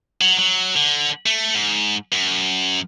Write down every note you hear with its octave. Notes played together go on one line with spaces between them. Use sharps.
F#3
F#3
D3
A3
G#2
F#2